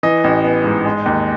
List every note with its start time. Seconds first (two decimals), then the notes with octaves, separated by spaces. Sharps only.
0.03 E3 D#5
0.24 A1
0.44 B3
0.64 G#2
0.85 G#3
1.06 D#2